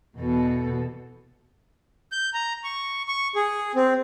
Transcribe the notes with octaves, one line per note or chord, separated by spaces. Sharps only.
E2 B2 A4
G6
A#5
C#6
C#6
G#4
C4